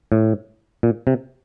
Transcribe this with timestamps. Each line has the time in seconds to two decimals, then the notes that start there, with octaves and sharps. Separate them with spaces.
0.12 A2
0.83 A#2
1.07 C3